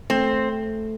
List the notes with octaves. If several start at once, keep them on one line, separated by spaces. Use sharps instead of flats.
A3 C4